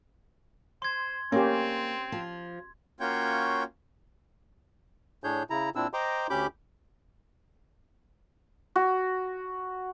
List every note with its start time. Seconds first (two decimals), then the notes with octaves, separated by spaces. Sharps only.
0.82 C5 C6 G#6
1.32 A#3 C4 C#4 G4
2.12 F3
3.00 A#3 C#4 F4 F#4 C#5 G5
5.24 A2 D4 G#4 C#5 G6
5.50 C#3 E4 A#5
5.75 A#2 C4 D4 E4 E6
5.93 C5 D#5 G5 A#5 C6 D6
6.30 D2 C#4 G4 B5 D6 G6
8.76 F#4